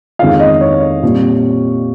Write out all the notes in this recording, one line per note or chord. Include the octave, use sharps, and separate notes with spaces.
F2 D#3 G#3 C#4 F4 F5
D#5
C#5
A#2 G3 C4 F4